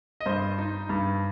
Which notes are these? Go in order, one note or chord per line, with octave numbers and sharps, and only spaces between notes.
D#5
G2 C5
D#4
G2